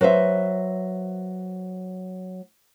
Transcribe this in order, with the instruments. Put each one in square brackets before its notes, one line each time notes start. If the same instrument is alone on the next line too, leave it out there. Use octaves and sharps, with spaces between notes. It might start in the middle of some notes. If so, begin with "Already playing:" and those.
[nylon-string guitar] F#3 B4 C5 E5